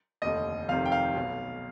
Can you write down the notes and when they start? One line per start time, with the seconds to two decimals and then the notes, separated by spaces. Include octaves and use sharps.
0.22 F1 D#2 D3 D#5
0.68 F1 F2 C3 D#3 F5
0.86 G5
0.92 F5
1.14 B1 B2